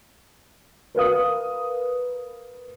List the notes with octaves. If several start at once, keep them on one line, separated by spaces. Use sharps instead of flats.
A#4 B4 F5 D#6